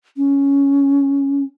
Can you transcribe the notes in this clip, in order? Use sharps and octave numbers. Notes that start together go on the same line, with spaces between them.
C#4